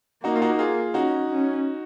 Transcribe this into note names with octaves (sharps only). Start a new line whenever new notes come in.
A#3 D#4 F#4
F4
D#4 F#4
F4 G#4
C#4 D#4 F#4
C#4